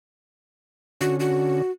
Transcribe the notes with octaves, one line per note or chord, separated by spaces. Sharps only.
D3 C#4 F#4
F#4